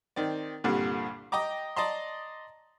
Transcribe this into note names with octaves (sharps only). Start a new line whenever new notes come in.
D#3 C4 D5
C2 G2 A#2 D3
D#5 G5 A#5 D6
D5 D#5 A5 A#5 C6